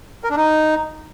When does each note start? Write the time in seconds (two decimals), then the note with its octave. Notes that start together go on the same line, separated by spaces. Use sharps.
0.24 A#4
0.30 D4
0.37 D#4